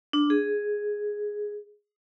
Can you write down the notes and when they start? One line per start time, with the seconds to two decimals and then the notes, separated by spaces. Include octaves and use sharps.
0.13 D4
0.30 G#4